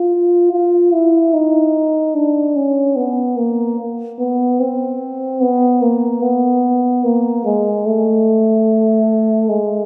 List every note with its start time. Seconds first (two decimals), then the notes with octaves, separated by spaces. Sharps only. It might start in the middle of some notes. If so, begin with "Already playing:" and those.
Already playing: F4
0.52 F4
0.93 E4
1.34 D#4
2.15 D4
2.56 C#4
2.96 B3
3.37 A#3
4.19 B3
4.60 C4
5.41 B3
5.82 A#3
6.22 B3
7.04 A#3
7.45 G#3
7.86 A3
9.49 G#3